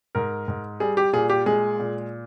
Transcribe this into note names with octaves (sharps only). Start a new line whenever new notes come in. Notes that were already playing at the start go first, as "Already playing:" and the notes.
G#2 A#4
G#2
G3 G#4
G4
A#2 G#4
G4
G#3 G#4
A#2